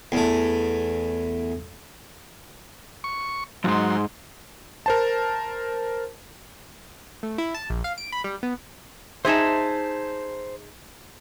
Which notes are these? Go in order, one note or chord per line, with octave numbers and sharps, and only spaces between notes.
E2 A3
C#6
F2 G#2 F#3 D#4 C6
A#4 C5 A5
A3
E4
A5
A#1
F5
D7
B5
G3
B3
D#4 G#4 C5 E5 A5